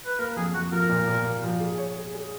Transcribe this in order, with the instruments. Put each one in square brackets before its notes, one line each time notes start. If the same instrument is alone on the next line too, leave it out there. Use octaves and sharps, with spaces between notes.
[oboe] B4
[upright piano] A#3 [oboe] A#4
[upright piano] F2 [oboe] G#4
[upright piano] F2 [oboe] F#4
[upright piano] F3 [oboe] A#4
[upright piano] A#2
A#2
A#3
F3
G#4
C#5
G#4
G#4